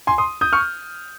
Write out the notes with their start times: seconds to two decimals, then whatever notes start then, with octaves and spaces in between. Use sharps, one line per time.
0.07 G#5 C6
0.18 C6 D#6
0.41 D#6 G6
0.53 C#6 F6